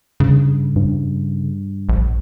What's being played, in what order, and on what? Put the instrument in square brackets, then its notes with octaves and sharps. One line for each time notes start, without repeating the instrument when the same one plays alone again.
[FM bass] G2 [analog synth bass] C#3
[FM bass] G2
[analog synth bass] A#1